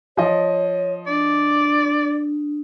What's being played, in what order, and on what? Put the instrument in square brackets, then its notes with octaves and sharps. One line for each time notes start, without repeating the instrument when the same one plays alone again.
[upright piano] F3 D#5 [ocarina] C#5
[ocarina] D4 [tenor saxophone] D5